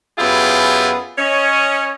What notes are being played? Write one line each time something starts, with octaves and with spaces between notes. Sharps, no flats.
F#2 B3 E4 F4 G4 G#4
C#4 C#5 D#5